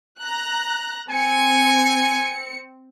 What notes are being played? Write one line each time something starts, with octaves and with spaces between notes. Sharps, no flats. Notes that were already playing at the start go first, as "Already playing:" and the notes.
A#5 F#6
C4 G#5 C#7